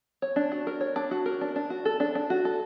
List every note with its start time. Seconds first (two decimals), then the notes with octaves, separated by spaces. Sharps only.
0.22 C#5
0.36 D4
0.52 F#4
0.67 A#4
0.81 C#5
0.96 D4
1.11 F#4
1.26 A#4
1.41 D4
1.56 D4
1.70 F#4
1.85 A4
2.00 D4
2.15 D4
2.30 F#4
2.45 A4